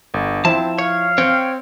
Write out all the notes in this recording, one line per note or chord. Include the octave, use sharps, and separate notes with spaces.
G1
F3 C4 E4 A5
C#5 F5
C4 C#5 G5